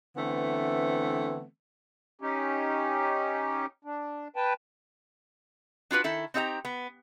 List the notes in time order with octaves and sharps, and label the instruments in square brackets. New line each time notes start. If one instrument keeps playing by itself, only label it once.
[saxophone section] D3 E3 A3 B3 C4
[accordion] C#4 D#4 G4
D4
B4 G5 A5
[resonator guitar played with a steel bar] D4 F4 F#4 B4
D#3 E4 A4
C4 D#4 G4 D#5 A#5
B3